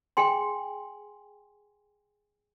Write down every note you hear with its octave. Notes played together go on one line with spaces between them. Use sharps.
G#4 G5 G#5 C6